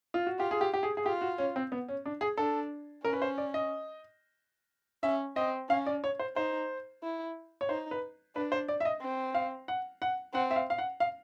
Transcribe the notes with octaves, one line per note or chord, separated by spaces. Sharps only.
F4
F#4
F4 G4
G#4
G4
G4
G#4
G#4
F4 G4
F#4
C#4
C4
B3
C#4
D4
G#4
D4 A4
C#4 A#4
B4
C5
D5
D#5
C#4 E5
C4 D#5
C#4 F5
D5
C#5
C5
D#4 C5
E4
C#5
D#4 C5
B4
D4 B4
C5
D5
E5
D#5
C4
F5
F#5
F#5
C4 F#5
E5
F5
F5
F#5
F5